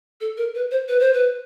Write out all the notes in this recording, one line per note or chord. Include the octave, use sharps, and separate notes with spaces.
A4
A#4
B4
C5
B4
C5
B4